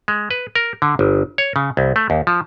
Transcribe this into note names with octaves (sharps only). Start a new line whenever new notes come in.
G#3
B4
A#4
D3
G1
C#5
C#3
C2
A3
D#2
F3